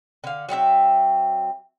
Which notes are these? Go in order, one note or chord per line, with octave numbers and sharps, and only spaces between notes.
D3 F5
F#3 C4 D#4 E5